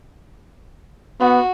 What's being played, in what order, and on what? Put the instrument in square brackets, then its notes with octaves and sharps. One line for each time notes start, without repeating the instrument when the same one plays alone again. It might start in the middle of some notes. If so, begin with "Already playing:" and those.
[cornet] B3 [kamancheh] F#4